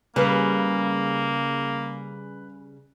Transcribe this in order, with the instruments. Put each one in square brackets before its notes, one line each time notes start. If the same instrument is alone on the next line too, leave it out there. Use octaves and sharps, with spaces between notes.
[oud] C#3 G3 C#4 [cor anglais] A#3 [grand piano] B4